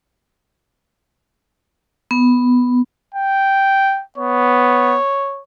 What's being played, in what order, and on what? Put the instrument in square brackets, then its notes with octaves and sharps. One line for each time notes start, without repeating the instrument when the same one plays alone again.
[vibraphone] B3
[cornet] G5
[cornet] B3 [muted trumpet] C#5